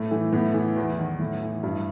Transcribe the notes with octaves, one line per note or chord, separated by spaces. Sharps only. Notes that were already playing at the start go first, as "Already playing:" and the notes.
Already playing: A2 A3
E3
A2 B3
E3
E2
D#3
A2
E3
G2 E4